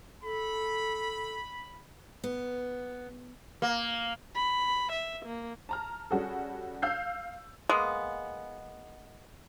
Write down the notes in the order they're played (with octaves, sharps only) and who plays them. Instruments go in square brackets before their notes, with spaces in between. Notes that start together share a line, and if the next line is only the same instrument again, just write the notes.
[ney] A4 [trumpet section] B5
[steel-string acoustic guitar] B3
[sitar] A#3
[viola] B5
E5
A#3
[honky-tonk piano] A5 A#5 F6
G3 C#4 F#4 G#4 A4
F5 E6 G6 C7
[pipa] G#3 A#3 B3